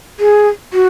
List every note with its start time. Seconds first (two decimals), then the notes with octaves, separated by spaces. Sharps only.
0.20 G#4
0.73 F#4